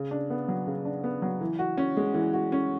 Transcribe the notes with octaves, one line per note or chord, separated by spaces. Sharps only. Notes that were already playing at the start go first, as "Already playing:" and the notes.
Already playing: C#3
D4
B3
F#3
C#3
D4
B3
F#3
E3
F#4
C#4
G#3
E3
F#4
C#4